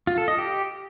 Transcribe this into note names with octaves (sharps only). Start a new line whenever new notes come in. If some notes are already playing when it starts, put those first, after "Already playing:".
F4
A4
D#5
G4